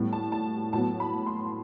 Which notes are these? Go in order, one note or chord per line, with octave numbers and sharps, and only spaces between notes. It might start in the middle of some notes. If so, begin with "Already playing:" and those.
Already playing: A2 G3 B3
A5
A5
A2 F#3 B3 A5
B5
C6